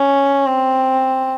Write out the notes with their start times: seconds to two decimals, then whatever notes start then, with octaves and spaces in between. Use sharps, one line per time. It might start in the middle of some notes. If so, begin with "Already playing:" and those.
Already playing: C#4
0.47 C4